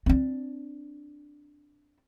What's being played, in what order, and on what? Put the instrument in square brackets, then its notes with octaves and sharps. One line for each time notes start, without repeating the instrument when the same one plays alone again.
[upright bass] C4 D4